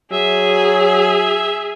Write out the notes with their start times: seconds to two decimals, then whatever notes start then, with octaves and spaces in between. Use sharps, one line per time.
0.12 F#3 G#4 E5